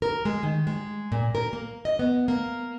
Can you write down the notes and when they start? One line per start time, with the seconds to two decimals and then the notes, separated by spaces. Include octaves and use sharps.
0.02 A#4
0.25 G#3
0.43 D#3
0.67 G#3
1.12 A#2
1.35 A#4
1.53 A#3
1.85 D#5
1.99 B3
2.28 A#3